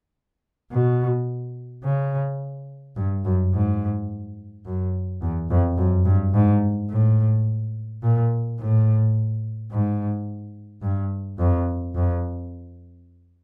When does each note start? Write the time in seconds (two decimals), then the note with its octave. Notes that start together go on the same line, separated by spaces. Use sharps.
0.72 B2
1.84 C#3
2.96 G2
3.25 F#2
3.53 G#2
4.65 F#2
5.22 E2
5.50 F2
5.77 F#2
6.05 G2
6.34 G#2
6.90 A2
8.03 A#2
8.59 A2
9.71 G#2
10.82 G2
11.38 F2
11.95 F2